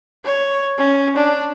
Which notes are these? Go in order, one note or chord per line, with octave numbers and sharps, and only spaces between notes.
C#5
C#4
D4